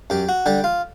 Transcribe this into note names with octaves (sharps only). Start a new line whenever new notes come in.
F#2 G4
F#4
D3 G3 G4
F4